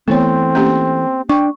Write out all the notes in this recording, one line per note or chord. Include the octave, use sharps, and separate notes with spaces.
E3 A3 B3 C4 C#5
A#3 C#4 G4
D4 G5 C#6